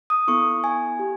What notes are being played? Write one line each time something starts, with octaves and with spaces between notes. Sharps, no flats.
D#6
B3 E4 A4 C#6
G#5
G4